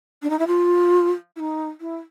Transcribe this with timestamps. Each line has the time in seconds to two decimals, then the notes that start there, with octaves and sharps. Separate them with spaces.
0.23 D4
0.30 D#4
0.39 E4
0.47 F4
1.36 E4
1.40 D#4
1.81 E4